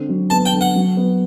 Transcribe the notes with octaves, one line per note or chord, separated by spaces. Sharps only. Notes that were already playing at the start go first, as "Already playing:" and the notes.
Already playing: D3 C4
F#3
B3 A5
G5
D3
F#5
F#3
B3